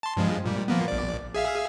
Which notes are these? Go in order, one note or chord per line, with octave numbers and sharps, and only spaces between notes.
A5 C6
G2 F3 G#3
A#2 G3
F3 A#3 B3
A#1 D5
G#4 E5 F5